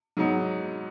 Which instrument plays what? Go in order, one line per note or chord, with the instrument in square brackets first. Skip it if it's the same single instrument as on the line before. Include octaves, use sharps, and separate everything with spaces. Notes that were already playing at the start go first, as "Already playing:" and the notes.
[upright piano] G#2 F#3 B3 D#4